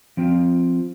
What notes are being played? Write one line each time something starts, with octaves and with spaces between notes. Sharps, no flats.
F3 C4 F4